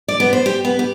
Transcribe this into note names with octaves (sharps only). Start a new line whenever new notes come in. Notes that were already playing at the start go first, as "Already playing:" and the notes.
D5
B3
C5
G4
B3
G4